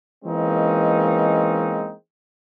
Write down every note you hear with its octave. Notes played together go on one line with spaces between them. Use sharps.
E3 G#3 A#3 C4 C#4 D#4